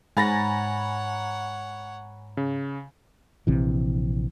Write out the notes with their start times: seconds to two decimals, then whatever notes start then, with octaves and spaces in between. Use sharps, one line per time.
0.17 G#2 C#5 F#5 G#5 A#5 B5 A6 A#6
2.37 C#3
3.47 A#1 C3 E3